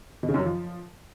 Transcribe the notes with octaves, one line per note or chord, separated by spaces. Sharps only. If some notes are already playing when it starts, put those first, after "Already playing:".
B2
C#3
F#2
F#3
F3